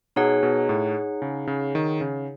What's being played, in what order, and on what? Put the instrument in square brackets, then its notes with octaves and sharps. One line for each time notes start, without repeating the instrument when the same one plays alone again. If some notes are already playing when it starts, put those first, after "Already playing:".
[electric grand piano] B2 [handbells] D#4 G#4 C#5 F#5
[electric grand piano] B2
A2
C#3
C#3
D#3
C#3